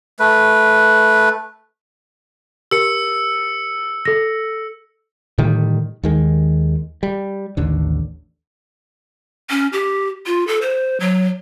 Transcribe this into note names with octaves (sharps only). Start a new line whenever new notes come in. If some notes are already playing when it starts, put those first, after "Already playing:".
A3 B4
G4 A#4 E6 C#7
A4 A#6
A2 D3 D#3 G3
D#2 D#3 G#3
G3
A1 D#2 D3
C#4
G4
F4
A4
C5
F#3